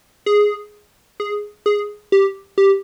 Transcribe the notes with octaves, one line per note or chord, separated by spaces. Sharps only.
G#4
G#4
G#4
G4
G4